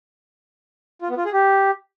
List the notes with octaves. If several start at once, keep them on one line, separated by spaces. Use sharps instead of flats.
F4
B3
F4
G#4
G4